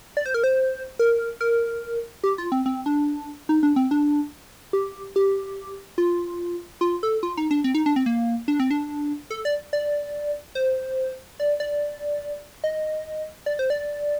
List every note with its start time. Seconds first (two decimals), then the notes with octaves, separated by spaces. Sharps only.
0.17 D5
0.26 C5
0.34 A#4
0.44 C5
0.99 A#4
1.41 A#4
2.24 G4
2.38 F4
2.52 C4
2.66 C4
2.86 D4
3.49 D#4
3.63 D4
3.76 C4
3.91 D4
4.73 G4
5.16 G4
5.98 F4
6.81 F4
7.03 A4
7.23 F4
7.37 D#4
7.51 D4
7.64 C4
7.75 D#4
7.86 D4
7.96 C4
8.06 A#3
8.48 D4
8.60 C4
8.71 D4
9.30 A4
9.45 D5
9.73 D5
10.55 C5
11.40 D5
11.60 D5
12.64 D#5
13.46 D5
13.59 C5
13.70 D5